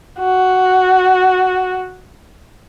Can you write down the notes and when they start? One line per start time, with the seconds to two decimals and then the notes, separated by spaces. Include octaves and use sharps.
0.20 F#4